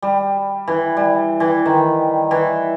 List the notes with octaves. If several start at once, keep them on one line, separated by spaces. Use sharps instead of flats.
G3
E3
G3
E3
D#3
E3